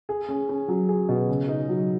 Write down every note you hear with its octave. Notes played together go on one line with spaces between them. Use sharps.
G#4
C#4
C#4
F#3
G#4
B2
C#3
D#4
F#3